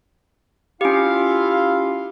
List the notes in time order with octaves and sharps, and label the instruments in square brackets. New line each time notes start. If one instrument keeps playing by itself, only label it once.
[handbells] C#4 G4 [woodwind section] E4 F4 F5